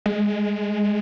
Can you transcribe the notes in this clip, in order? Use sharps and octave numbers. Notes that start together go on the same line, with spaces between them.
G#3